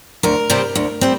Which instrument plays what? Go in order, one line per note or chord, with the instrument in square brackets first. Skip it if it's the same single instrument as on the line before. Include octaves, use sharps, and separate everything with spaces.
[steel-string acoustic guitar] D2 A#4
C3 G3 C4
D2
G3 C4